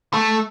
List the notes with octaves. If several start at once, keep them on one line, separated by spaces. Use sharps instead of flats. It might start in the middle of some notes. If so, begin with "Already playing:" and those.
A3